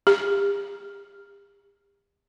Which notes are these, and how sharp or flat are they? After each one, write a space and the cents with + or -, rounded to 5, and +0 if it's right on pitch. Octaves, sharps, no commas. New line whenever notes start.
G4 +40